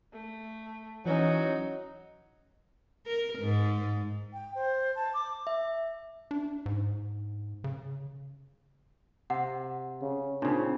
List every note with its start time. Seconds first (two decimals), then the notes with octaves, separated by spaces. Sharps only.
0.13 A3
1.05 E3 F#3 C#4 D#4
3.06 A#4
3.40 G#2
4.33 G5
4.55 C5
4.96 A5
5.14 D6
5.47 E5
6.31 D4
6.66 G#2
7.64 C#3
9.30 C3 F#5
10.02 C#3
10.42 A#2 C#3 C4 D4 D#4